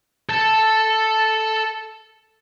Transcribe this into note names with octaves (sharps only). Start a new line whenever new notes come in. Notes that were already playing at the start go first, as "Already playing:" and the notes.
A4 A5